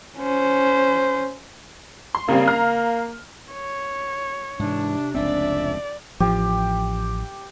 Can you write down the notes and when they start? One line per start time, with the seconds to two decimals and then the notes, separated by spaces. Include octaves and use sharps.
0.18 C#4 C5
2.15 C6
2.28 C#3 G3 A#3 C4
2.48 F5 A#5 F6
3.54 C#5
4.59 G#2 C3 E3 D4
5.14 F1 C#2 C4 D4 D5 E5
6.20 A1 F3 G4